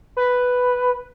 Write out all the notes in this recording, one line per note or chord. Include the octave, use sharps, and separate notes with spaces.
B4